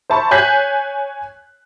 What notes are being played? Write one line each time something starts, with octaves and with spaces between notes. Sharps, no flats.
C5 E5 A5 B5 C#6
C#5 G#5 F#6 G6 B6 C7